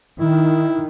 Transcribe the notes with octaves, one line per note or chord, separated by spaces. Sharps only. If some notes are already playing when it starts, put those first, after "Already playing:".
D#3 E4